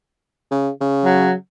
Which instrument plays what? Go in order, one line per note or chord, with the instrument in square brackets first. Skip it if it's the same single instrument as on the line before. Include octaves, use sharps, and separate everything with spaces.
[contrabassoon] C#3
C#3
[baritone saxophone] F#3